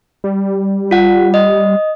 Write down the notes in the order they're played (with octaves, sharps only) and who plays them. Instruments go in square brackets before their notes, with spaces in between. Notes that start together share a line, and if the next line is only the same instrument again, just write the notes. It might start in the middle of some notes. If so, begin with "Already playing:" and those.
[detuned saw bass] G3
[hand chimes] F4 F#5
D#5